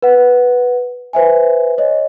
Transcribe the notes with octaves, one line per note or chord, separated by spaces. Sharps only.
B4 F#5
B4 C5 E5 G#5
C#5 D#5